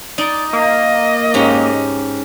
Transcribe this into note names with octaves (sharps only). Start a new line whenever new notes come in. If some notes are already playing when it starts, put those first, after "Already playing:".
D#4 D5
A#3 D#5
G#2 C#4 G4